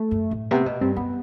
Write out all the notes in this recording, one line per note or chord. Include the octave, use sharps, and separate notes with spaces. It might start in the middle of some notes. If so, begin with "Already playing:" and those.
Already playing: A3
F#2
A2
C3 B3
B2
G2 C4
F#2 B3